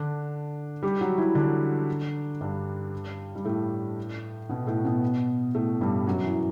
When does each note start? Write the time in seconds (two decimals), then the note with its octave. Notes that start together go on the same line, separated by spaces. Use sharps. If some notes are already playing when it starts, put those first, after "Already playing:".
Already playing: D3 D4
0.83 G3 G4
1.01 F#3 F#4
1.18 E3 E4
1.35 D3 D4
2.41 G2 G3
3.35 G3
3.45 A2 A3
4.49 B2 B3
4.67 A2 A3
4.85 B2 B3
5.55 A2 A3
5.81 G2 G3
6.06 F#2 F#3
6.24 E3